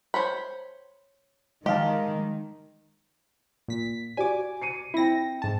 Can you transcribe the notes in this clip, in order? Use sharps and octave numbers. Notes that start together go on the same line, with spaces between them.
C5 C#5 B5
D#3 G#3 G4 D#5 F5 A5
A#2 B6
F#4 G4 D5 G#5 D6
C7 C#7 D#7
C4 E4 G5 A#6
G#2 A5